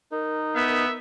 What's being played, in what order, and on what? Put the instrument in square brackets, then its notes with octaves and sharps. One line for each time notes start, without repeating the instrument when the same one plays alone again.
[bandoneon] D#4 [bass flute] A#4
[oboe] B3 [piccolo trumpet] E5